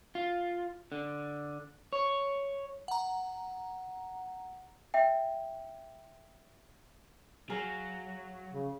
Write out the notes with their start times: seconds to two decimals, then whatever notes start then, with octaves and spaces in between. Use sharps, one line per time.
0.15 F4
0.92 D3
1.93 C#5
2.88 F#5 A#5
4.94 E5 G5
7.50 F#3 G#4 F5 A#5
8.53 C#3